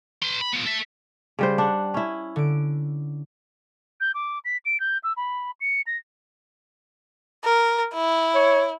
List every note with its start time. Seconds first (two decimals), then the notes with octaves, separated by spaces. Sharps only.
0.23 B4 C6
0.41 B5
0.54 F3 B3
0.66 A4 E5
1.39 C#3 G3 C5
1.58 D4 F#5
1.94 C#4 E4
2.36 D3 D7
4.00 G6
4.14 D6
4.45 B6
4.65 D7
4.80 G6
5.04 E6
5.17 B5
5.61 C#7
5.87 A#6
7.44 A#4
7.94 E4
8.35 C#5